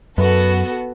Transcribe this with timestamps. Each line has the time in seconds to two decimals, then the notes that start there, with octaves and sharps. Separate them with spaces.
0.18 F#2 B3 F#4 A4